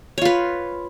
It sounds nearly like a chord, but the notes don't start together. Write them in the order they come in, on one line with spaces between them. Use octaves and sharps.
C#5 F4 B4